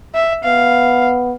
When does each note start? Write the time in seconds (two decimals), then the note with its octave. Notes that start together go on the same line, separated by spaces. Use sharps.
0.15 E5
0.44 B3 F5